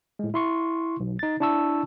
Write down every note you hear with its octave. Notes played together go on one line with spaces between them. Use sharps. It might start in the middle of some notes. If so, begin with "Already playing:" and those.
A2 G#3
E4 C6 C#6
B1
D#4 A6
D4 E4 A5 C#6 E6